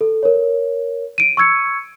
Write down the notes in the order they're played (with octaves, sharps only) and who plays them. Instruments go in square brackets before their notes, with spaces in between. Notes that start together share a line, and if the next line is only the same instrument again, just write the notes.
[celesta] A4
A#4 C#5
D7 D#7
C#6 E6 G#6 C#7